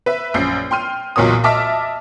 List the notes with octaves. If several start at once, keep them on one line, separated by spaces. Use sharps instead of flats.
B4 E5
A#1 F#2 G6 C7
G5 C6 F6 D#7
B1 E2 A#2 A#4 C#5 D#6
D#5 E5 A5 D6 F6 B6